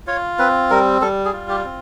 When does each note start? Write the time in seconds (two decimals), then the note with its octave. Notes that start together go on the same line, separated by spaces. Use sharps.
0.07 F4 C#5
0.39 C4 B4
0.70 G3 A#4
1.01 G3 A4
1.25 G#4
1.33 F4
1.49 G4
1.64 C4